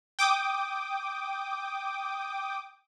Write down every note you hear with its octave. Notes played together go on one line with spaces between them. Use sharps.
G5 D6 D#6